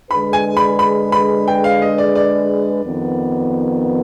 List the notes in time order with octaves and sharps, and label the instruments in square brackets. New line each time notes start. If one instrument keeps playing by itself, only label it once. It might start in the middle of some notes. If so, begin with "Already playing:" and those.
[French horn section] D3 G#3 D4 G#4 B4 [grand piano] B5
[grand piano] G#5
B5
B5
B5
G5
F5
D#5
D5
D5
[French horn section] F2 D#3 B3